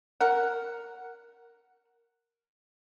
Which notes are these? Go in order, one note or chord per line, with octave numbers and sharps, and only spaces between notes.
A#4 F#5